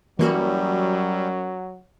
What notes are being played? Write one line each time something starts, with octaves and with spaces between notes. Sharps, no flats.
F#2 E3 F#3 G3 A#3 F#4